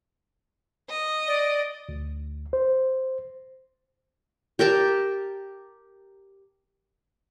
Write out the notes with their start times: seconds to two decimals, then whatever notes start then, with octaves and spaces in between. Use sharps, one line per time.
0.90 D#5
1.27 D5
1.89 D2
2.53 C5
4.59 G4 A#4 G5 A5